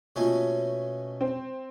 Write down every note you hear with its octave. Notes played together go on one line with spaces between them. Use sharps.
B2 A3 A#3 C#4 F4
C4